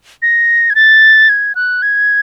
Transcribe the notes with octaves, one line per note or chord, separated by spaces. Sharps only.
A#6
G#6
A6
G#6
F#6
G#6